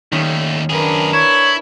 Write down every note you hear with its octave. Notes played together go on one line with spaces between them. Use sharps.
D#2 D#3 A3 C#4
F#2 D4 G#4 A#4 B4
E4 C#5